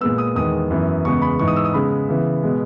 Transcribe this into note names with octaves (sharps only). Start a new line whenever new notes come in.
A#2 G#3 B3 E6
D#6
E2 D#3 G#3 B3 D#6
F#2 E3 B3
E2 C#3 G#3 B3 C#6
B5
G#2 E3 G#3 B3 C#6
D#6
E6
D#6
C#3 G#3 B3 B5
C#3 E3 B3
B2 G#3 B3